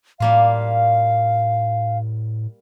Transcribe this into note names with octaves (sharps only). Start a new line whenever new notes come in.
A2 G3 A#3 F4 F5